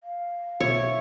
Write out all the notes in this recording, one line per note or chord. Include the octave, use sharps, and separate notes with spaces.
F5
B2 B3 E4 C#5